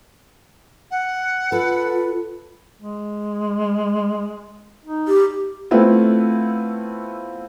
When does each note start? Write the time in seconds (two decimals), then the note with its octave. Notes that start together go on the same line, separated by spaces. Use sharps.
0.91 F#5
1.52 F4 A4 B4
2.82 G#3
4.85 D#4
5.08 G4
5.71 A3 B3 C4 E4 F4